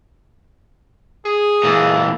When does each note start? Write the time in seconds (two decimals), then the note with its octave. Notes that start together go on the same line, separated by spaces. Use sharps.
1.26 G#4
1.64 A#2 E3